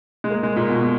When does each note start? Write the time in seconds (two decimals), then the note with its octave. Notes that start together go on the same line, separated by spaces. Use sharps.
0.24 G#3
0.30 A#3
0.43 G#3
0.56 A#2
0.69 B2